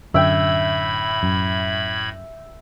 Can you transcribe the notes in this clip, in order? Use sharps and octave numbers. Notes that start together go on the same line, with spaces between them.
F#2 A2 D3 E5 G5 B5 G#6
F#2